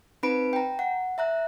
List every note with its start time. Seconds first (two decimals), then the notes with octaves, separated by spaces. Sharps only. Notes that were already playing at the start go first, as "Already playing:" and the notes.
0.23 C4 D#4 B4 B5 D7
0.53 G5 A#5
0.79 F#5
1.18 E5 A#5 F#6